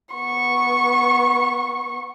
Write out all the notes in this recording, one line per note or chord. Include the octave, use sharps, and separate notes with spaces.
B3 C#6